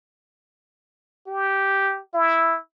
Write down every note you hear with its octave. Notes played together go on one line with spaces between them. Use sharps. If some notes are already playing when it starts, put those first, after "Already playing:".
G4
E4